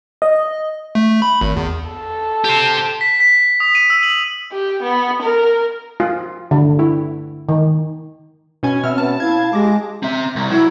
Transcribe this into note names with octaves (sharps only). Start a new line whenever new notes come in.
D#5
A3
B5
G#1
E2
A4
G4 C5
B6
B6
D#6
D#7
E6
F#7
G4
B3
A#4
F4
D3
E4
D#3
B2 C#4 G#5
B2 C4 C#4 E5 F6
B3 A5
E4 F5 G#6
G#3 G4 D6 A#6
C4 E5 A#5
C2
F#3 E4